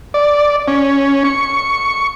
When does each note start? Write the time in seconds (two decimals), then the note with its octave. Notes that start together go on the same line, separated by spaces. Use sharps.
0.14 D5
0.68 C#4
1.24 C#6